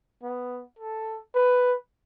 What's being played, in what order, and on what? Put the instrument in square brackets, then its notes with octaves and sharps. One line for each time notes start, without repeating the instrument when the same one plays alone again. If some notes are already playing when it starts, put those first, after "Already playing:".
[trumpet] B3
A4
B4